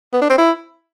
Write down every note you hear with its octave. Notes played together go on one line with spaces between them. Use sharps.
B3
D4
C4
E4